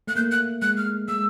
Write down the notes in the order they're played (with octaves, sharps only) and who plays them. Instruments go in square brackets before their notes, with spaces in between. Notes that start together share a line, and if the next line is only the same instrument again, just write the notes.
[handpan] A3 [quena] F#6
[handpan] A#3 [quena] G6
[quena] F#6
[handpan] G#3 [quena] F#6
[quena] F6
[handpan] G#3 [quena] E6